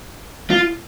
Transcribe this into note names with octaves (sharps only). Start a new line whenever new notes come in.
F4